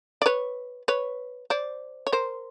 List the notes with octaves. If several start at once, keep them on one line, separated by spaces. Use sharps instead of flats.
D5
B4 C#5
B4 C#5
C5 D5
C#5
A#4 C5